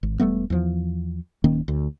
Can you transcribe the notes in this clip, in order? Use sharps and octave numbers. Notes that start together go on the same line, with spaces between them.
G#1
E1 G3 A3 B3
E2 F3
D1 D#3 A#3 C#4
D2